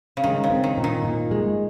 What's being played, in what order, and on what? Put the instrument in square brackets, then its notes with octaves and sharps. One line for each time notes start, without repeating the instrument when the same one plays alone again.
[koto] C#3
[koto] D#3 [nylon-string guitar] G#3
[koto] C#3
[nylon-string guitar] C4
[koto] D#3
[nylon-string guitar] A#2
[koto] D#3
[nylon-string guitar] A#2
G#3